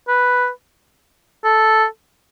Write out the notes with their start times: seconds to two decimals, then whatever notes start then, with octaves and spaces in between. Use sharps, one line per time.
0.08 B4
1.44 A4